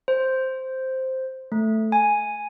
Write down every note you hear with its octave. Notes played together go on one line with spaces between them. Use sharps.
C5
A3
G#5